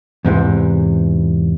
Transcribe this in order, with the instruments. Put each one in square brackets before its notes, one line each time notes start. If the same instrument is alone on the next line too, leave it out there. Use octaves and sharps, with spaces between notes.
[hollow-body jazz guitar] E2 G#2 C3 E3